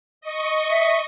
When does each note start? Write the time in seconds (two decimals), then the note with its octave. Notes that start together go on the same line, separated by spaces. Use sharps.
0.21 D#5 C#6
0.70 E5